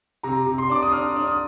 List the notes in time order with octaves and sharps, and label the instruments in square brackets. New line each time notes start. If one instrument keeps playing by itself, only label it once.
[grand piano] C3 A#5
C3
C6
D4 D6
D#6
D4 F6
D4
D#6